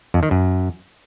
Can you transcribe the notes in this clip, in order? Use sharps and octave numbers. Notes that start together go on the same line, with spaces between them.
F2
D#3
F#2